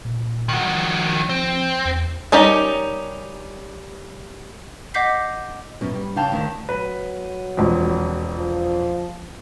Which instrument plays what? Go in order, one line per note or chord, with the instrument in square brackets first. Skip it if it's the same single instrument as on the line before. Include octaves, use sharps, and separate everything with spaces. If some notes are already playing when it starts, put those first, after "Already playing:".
[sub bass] A#2
[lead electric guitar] D#3 F#3
[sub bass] F3
[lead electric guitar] C4
[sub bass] E2
[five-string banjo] G3 C#4 D#4 G4 A#4
[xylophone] D#5 F#5 D6 G6 B6 C7
[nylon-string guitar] F#2 B2
G3
C#3 D5 F5 G5 A5
D2 D#3
[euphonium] F#3 [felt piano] B4
[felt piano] E1 F2
[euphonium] F3